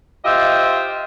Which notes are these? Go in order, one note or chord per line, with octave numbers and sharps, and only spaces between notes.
F4 G4 C5 D#5 E5